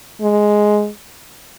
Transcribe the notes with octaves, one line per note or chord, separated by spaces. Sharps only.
G#3